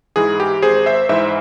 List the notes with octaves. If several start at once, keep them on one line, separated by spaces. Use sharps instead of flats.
G#2 E3 G#4
G4
G#1 G#4 C5
C5 E5
G#2 E3 C5 E5